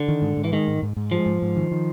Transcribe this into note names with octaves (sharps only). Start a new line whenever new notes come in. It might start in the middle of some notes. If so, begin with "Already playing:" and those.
Already playing: D3
D#3
G#2
G#2
E3
D#3 G#3
G#2
G#2
G#2
F3 G#3
G#2
G#2
D#3
D#3